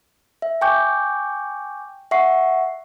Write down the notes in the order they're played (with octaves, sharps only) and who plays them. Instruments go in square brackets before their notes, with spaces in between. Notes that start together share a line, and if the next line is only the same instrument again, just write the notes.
[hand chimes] E5
G5 G#5 C#6 D6 G6
E5 F#5 C#6 C7